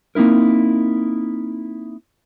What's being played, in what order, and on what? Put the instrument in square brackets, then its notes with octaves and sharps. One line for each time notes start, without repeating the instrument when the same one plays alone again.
[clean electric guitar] A#3 C4 D#4 E4 A#4